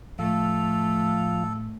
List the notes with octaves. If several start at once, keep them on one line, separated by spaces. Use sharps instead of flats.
A2 F3 A3 A4 F5